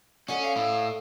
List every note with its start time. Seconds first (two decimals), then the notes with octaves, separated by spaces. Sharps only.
0.28 C#4 A4 D5 D#5 F#5
0.43 F5
0.56 A2